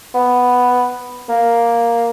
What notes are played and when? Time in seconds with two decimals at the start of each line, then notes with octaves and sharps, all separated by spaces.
0.14 B3
1.29 A#3